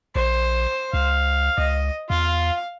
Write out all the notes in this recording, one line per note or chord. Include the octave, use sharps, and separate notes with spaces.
A#1 C5
C#2 F5
C#2 D#5
E2 F4 F5